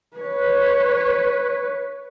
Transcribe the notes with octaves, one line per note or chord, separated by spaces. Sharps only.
B4 C#5